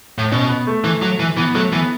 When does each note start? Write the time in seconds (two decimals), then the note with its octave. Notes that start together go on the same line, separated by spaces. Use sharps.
0.18 A2
0.32 B2 C#4
0.49 B3
0.67 A3
0.84 E3
1.02 F#3
1.20 E3
1.37 E3 B3
1.55 F#3 A3
1.73 E3 B3